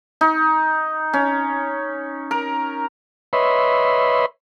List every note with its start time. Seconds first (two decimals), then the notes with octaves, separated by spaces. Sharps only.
0.21 D#4
1.13 C#4
2.31 A#4
3.33 B4 C#5 D#5 E5 B5 C6